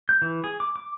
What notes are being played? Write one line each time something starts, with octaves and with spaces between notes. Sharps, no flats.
G6
E3
G#4
D6
D6